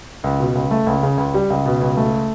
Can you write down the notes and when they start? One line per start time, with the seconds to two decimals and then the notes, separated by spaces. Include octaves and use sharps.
0.24 C#2
0.40 B2
0.55 C#2
0.71 A3
0.87 C#2
1.03 C#3
1.18 C#2
1.34 G3
1.50 C#2
1.66 B2
1.81 C#2
1.97 A3